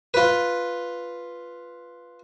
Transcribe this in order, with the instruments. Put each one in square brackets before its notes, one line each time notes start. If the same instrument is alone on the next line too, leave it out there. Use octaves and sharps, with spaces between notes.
[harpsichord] F4 B4